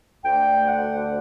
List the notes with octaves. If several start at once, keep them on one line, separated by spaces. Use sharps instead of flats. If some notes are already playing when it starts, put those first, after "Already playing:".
D2 D3 A3 G5
F#5